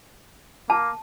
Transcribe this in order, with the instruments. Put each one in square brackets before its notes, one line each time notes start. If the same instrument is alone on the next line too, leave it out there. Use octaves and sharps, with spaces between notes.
[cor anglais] A#3 [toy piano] A5